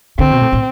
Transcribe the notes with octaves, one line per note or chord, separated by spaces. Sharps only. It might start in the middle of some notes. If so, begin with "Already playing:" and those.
D3 C4
B2
A2
A2